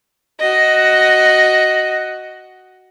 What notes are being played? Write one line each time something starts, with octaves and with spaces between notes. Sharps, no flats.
F#4 D#5